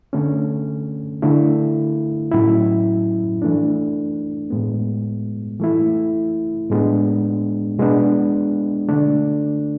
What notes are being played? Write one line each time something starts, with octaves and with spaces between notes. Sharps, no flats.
D3 A3 C#4
D3 A3 E4
A2 F#3 C#4 E4
E3 A3 D4
A2 G#3 B3
E3 A3 E4
A2 G#3 B3 D4
B2 G#3 B3 D4
D3 A3 D4